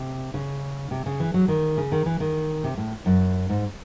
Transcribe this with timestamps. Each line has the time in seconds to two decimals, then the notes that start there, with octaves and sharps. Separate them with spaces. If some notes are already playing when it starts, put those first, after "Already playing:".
Already playing: C3
0.34 C#3
0.91 C3
1.06 C#3
1.20 E3
1.34 F#3
1.48 D#3
1.77 C#3
1.92 D#3
2.06 E3
2.20 D#3
2.64 C3
2.77 A2
3.06 F#2
3.50 G#2